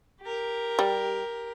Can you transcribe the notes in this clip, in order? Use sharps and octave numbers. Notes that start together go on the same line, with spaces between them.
G4 A#4
G3